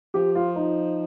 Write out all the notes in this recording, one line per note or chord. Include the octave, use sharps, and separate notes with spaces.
F3 G4
F4
D#4